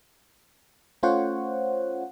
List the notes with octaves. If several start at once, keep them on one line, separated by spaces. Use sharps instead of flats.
A3 C#4 F4 C5 C#5 F#5